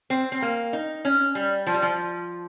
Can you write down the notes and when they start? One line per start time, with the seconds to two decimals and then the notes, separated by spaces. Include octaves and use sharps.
0.10 C4
0.32 C4
0.42 A#3
0.73 D#4
1.05 C#4
1.35 G3
1.67 F3
1.74 G3
1.82 F3